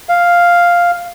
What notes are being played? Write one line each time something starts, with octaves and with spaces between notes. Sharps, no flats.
F5